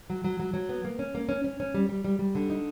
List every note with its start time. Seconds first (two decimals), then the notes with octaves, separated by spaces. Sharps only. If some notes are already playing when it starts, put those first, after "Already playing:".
0.10 F#3
0.24 F#3
0.40 F#3
0.54 F#3
0.69 B3
0.85 A#3
0.99 C#4
1.15 A#3
1.29 C#4
1.44 C#4
1.60 C#4
1.74 G3
1.89 G3
2.05 G3
2.19 G3
2.35 D3
2.50 D#4